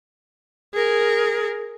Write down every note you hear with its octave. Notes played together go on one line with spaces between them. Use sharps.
G#4 A#4